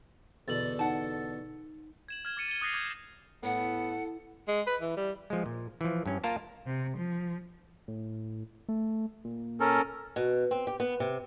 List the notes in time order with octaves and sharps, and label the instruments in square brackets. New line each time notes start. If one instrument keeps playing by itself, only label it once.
[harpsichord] E2 B2 D3 [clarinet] A4 [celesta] A6 F#7
[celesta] D#4 [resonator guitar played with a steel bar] F#5 A5
[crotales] G#6 E7 F#7
F6 G#6 E7
D6 A6 C#7 D#7 E7
A6 C#7 D#7 G7
D6 D#6 F#6 A6 A#6 C7
D6 G6 G#6
[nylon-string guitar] A2 [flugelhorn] B3 [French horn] A4 [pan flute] F#5
[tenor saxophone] G#3
B4
E3
G3
[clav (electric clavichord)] F3 G#3
A#2
E3 F3
G2 C#4
A#3 F4 A#4 A5
[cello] C3
F3
[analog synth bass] A2
A3
A#2
[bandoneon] C#4 A4 A#4
[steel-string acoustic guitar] B2
C4
G4
B3
C3